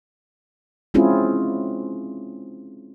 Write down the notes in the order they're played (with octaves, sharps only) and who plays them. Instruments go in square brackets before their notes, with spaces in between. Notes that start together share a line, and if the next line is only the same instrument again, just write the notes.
[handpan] G#3 C4 C#4 E4 F4 G#4